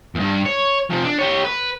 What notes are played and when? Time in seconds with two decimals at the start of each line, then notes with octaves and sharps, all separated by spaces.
0.15 E2 G2
0.46 C#5
0.91 C3 F3
1.04 D4
1.19 G4 C#5
1.45 B4